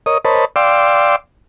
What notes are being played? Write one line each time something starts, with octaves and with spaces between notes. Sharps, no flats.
A#4 C#5 D#5 D#6
A#4 C5 C#5 D#5 A5 B5
D5 F5 G5 C6 D6 E6